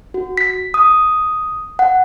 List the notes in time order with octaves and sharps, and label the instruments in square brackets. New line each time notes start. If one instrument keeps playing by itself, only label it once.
[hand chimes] F#4
B6
D#6
F#5